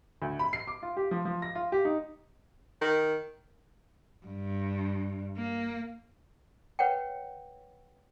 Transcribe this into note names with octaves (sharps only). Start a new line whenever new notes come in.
D2
B5
C7
D6
F4
G4
F3
F3
A#6
F4
G4
D#4
D#3
G2
A#3
B4 C#5 F#5 G5